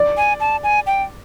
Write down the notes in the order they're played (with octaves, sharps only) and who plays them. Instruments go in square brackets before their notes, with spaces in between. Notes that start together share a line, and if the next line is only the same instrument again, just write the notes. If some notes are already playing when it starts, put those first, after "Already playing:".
Already playing: [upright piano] D5
[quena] G#5
A5
G#5
G5